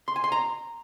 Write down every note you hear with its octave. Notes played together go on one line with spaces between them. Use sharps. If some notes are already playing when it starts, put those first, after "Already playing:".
C6
G#5
C6
A#5